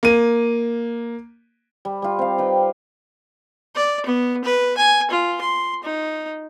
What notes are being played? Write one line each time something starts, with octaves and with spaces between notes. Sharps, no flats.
A#3 D#7
G3
G3 F4
C4 F5
D#4 B4 G5
D5
B3
B4
G#5
F4
C6
D#4